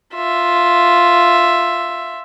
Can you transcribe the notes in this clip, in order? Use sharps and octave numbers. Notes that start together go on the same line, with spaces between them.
F4 E5